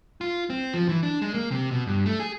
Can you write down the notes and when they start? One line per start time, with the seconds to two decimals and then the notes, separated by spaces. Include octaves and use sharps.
0.21 F4
0.50 C4
0.74 F3
0.89 E3
1.03 D4
1.22 G#3
1.34 A#3
1.51 C3
1.71 B2
1.87 G2
2.05 A3
2.20 G#4